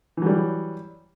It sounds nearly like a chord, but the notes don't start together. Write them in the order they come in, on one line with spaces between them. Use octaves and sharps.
E3 F#3 G3